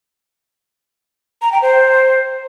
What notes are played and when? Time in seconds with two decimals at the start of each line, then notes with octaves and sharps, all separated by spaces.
1.42 A#5
1.52 G5
1.62 C5